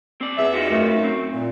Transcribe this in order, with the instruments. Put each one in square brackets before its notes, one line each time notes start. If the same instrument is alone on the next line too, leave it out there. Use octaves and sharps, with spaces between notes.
[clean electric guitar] C4 D5
[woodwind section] E2 E5
[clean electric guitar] D#4 F4 F#4
[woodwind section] F#2 A3
[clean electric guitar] C4
[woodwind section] A#2